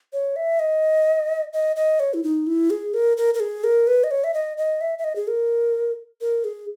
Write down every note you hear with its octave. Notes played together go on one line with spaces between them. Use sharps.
C#5
E5
D#5
D#5
D#5
C#5
E4
D#4
E4
G#4
A#4
A#4
A#4
G#4
A#4
B4
D#5
C#5
E5
D#5
D#5
E5
E5
D#5
G#4
A#4
A#4
G#4